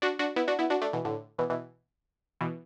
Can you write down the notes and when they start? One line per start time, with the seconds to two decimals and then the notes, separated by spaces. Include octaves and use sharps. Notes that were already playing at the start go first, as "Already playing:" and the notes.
0.02 D4 F#4
0.19 D4 F#4
0.36 B3 E4
0.48 D4 F#4
0.59 B3 E4
0.70 D4 F#4
0.81 A3 D4
0.93 B2 E3
1.05 A2 D3
1.39 B2 E3
1.50 B2 E3
2.41 B2 E3